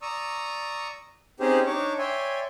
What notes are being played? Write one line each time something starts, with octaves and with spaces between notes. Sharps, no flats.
D5 A#5 C#6 D#6 E6
C4 C#4 D#4 G4 G#4 C5
D4 D#4 C#5 C#6 D6
C#5 D5 E5 G5 G#5 C6